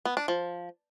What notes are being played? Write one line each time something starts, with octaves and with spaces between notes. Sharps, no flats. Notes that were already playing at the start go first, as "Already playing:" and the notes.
B3
D4
F3